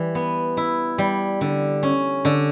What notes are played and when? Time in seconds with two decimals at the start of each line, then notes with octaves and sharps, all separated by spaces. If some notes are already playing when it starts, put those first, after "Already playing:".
Already playing: E3 G3
0.15 B3
0.57 E4
0.98 G3
1.41 D3
1.83 C#4
2.25 D3